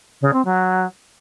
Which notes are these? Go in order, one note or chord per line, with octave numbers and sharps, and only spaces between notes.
C#3
C4
F#3